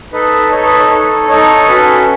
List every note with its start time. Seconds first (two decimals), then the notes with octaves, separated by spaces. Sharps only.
0.13 D#4 A4 B4
0.51 D#4 A4 C#5
0.65 B4
0.79 C#5
0.90 D#4 A4
1.29 D#4 A4 C#5
1.68 C#4 F#4 A4 B4